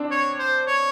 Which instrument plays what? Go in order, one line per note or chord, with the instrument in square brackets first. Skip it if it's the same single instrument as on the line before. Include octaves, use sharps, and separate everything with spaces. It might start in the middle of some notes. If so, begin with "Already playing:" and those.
Already playing: [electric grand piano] C4 D4
[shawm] C#5
C5
C#5